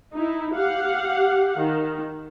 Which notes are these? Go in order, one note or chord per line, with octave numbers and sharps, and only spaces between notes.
D#4 E4
G4 F5 F#5
D#3